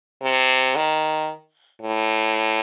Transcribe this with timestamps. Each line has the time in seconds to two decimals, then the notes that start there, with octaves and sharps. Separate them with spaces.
0.22 C3
0.76 D#3
1.82 A2